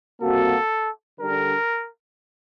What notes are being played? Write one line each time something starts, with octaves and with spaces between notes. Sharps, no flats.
C3 G3 A#3 F#4 A4
D3 G3 D4 A#4